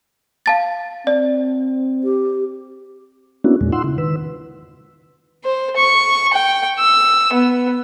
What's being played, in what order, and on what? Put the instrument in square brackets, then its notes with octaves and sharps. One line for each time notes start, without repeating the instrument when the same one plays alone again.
[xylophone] F5 A5 A6
[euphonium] C4 [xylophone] D5
[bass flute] G4
[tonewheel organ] A#3 B3 C#4 D4 E4 F#4
E2 A#2 G#3
D#4 F4 F#5 C6 E6
C#3 E4
D#3 B4 E6
[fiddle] C5
C#6
G5
E6
B3